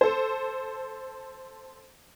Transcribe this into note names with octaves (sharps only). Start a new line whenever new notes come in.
A4 C5